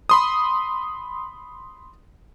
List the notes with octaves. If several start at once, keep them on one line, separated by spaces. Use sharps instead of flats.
B5 C6 D#6